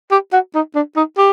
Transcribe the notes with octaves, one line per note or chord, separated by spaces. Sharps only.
G4
F#4
D#4
D4
D#4
G4